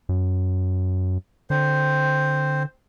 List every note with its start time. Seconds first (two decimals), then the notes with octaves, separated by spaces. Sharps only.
0.09 F#2
1.50 D3 C4 C5